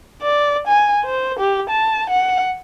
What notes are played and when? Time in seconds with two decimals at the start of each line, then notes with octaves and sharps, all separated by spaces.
0.22 D5
0.67 G#5
1.05 C5
1.39 G4
1.70 A5
2.10 F#5